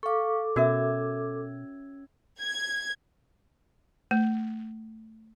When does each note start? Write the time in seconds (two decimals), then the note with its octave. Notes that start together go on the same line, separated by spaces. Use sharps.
0.03 A4 F5 C#6 D6
0.56 B2 C#4 F#4 A#4 E5 E6 G#6
2.41 G#6
4.11 A3